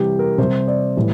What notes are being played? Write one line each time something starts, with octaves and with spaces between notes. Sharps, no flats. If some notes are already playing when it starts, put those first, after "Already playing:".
Already playing: C3 E3 G3 G4
A#4
C3 G3 C5
D5
A2 E3 G3